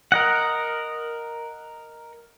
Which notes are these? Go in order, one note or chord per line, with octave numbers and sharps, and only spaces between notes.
A#4 D#5 F#5